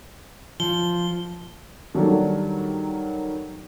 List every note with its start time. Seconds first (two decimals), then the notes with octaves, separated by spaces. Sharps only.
0.60 F3 G7
1.95 D#3 F#3 G3 D4 A4